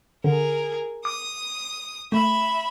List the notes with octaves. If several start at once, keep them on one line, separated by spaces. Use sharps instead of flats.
D3 G#4 A#4
D6 D#6
A3 E5 B5